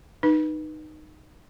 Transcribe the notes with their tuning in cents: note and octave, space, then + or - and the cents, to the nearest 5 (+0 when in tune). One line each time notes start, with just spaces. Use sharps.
D#4 -15 B4 -15